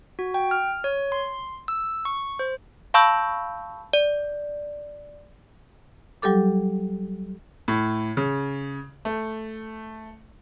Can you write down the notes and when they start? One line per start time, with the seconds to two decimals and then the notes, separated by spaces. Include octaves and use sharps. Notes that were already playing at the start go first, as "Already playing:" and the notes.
0.19 F#4
0.34 G5
0.51 F6
0.84 C#5
1.12 C6
1.68 E6
2.05 C#6
2.39 C5
2.94 F5 A5 B5 C#6 E6 G6
3.93 D5
6.22 F#3 G3 G4 A4 D6
7.68 A2
8.17 C#3
9.05 A3